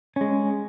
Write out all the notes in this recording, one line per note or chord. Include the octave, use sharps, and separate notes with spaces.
G#3 C#4